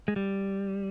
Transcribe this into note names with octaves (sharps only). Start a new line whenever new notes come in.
G#3
G3